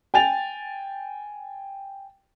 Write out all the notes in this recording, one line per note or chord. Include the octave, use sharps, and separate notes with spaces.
G5 G#5 A6 F7